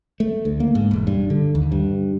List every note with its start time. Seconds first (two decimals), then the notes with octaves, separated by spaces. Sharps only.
0.20 A3
0.45 D2
0.60 A#3
0.75 G#2
0.91 E1
1.07 G2
1.30 D3
1.55 D#2
1.72 G2